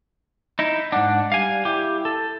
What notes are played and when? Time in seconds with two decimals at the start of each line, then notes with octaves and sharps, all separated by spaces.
0.59 D#4 E4
0.92 G#2 D4 F#5
1.32 G3 F5 G#5
1.65 E4 G4
2.05 A4